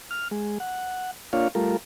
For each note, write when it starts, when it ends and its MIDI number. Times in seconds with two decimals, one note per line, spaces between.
0.11 0.28 89
0.31 0.58 56
0.60 1.11 78
1.33 1.48 58
1.33 1.48 62
1.33 1.48 65
1.33 1.48 73
1.33 1.48 77
1.55 1.77 55
1.55 1.77 57
1.55 1.77 65
1.55 1.77 70